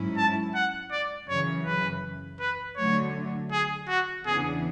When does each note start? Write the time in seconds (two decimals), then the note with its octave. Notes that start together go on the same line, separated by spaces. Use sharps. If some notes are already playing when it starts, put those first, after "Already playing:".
Already playing: G#2 F#3 C#4 E4
0.17 A5
0.55 F#5
0.92 D5
1.29 F#2 C#3 E3 C#5
1.66 B4
2.40 B4
2.77 D3 F#3 A3 C#5
3.52 G#4
3.89 F#4
4.26 E2 C#3 E3 B3 D4 G#4